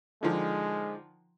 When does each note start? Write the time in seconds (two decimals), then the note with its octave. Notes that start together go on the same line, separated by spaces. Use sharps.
0.23 D3 D#3 F3 G#3